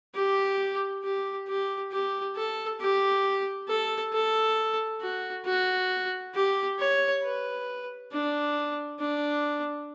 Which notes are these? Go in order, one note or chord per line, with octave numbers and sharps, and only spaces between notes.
G4
G4
G4
G4
A4
G4
A4
A4
F#4
F#4
G4
C#5
B4
D4
D4